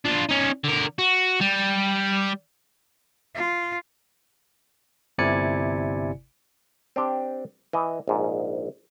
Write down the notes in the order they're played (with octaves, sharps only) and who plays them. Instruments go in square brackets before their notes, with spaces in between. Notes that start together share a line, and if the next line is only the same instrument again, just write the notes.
[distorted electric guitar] D4 F4
C#4 D#4
D3 A#4
F#4
G3
[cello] F4
[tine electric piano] G1 C3 E4 D5 G#5 C#7
[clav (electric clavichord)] C4 D4 G4
E3 D#5
A#1 G#2